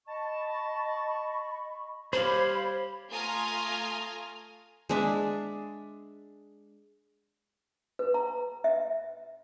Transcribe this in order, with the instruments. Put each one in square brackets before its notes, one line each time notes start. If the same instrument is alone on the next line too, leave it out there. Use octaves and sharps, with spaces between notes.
[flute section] D#5 B5 C#6 [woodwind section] A5
[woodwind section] G3 G4 [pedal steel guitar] C5 F5 [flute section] C#5 G#6 [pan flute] B5
[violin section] A3 F4 G#5 A#5 D#6 F6
[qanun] G#3 D4 E5
[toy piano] B4
A#5
E5